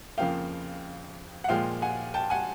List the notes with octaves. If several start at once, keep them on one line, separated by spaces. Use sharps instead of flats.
F2 C#3 F3 A#3 F5 G5
F#5
A#2 F3 G#3 F5 G5
F#5 G#5
G5 A5
F#5 G#5